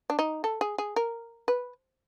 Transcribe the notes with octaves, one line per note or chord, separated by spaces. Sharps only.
D4
D#4
A4
G#4
G#4
A#4
B4